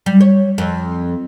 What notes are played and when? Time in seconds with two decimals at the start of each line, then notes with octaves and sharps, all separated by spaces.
0.06 G3
0.20 C#5
0.58 F2